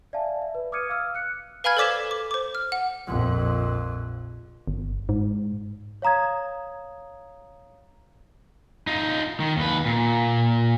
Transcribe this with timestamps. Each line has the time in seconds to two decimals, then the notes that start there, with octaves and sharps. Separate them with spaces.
0.13 D5 E5 F5 G#5 A5
0.42 E5
0.55 B4
0.72 D6 D#6 F6 G#6 C#7 D#7
0.89 F5 D6 E6 F6
1.15 F#6 C#7
1.64 B4 F5 G#5 B5 F6 G#6
1.77 A4 C5 D5 D6 B6 E7
2.11 D6
2.31 C5 D6
2.55 F6
2.72 F#5
3.08 A#1 F2
4.68 G1
5.09 G#2
6.02 C#5 F5 A#5 D#6 G#6
8.87 D#4 F4
9.40 D#3
9.57 D#2 B4
9.86 A#2